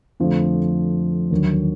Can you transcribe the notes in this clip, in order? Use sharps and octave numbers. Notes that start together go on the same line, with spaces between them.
F2 D3 F3 A3
D#2 D3 F#3